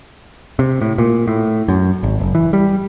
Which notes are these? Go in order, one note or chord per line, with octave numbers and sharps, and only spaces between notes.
C3
A2
A#2
A2
F#2
G#1
F#1
E3
G3